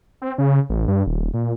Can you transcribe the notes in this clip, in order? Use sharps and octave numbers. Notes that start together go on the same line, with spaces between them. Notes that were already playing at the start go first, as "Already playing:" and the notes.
C4
C#3
A1
G2
D#1
A#2